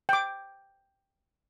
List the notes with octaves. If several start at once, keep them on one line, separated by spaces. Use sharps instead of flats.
G5 D6